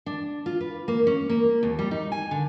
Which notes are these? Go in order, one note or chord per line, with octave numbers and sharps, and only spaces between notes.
D4
F4
B4
A#3
C#4
A#3
D#2
G3
D#4
G#5
D3